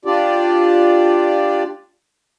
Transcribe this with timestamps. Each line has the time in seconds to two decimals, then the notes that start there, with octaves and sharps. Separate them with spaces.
0.05 D4 F4 G4 D5